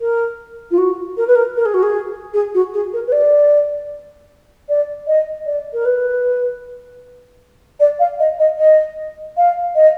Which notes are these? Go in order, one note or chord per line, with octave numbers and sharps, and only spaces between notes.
A#4
F4
F#4
A#4
B4
A#4
A#4
G#4
F#4
G#4
G#4
F#4
G#4
A#4
B4
D5
D5
D#5
D5
A#4
B4
D5
F5
D#5
D#5
D#5
F5
D#5